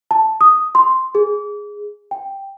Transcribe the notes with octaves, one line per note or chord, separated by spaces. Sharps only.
A5
D#6
C6
G#4
G5